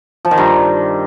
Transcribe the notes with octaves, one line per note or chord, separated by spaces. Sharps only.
F3
D#3
G2